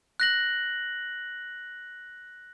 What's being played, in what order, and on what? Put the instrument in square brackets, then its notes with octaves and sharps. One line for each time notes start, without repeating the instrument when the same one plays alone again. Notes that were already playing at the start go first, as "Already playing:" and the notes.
[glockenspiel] F#6 A#6 F#7